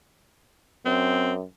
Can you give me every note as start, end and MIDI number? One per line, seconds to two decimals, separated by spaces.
0.85 1.43 42
0.85 1.33 60